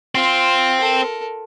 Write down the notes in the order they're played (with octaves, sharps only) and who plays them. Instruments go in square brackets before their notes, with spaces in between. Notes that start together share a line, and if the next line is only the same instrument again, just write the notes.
[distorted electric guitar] C4 [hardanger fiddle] F4
[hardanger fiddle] A4 A#4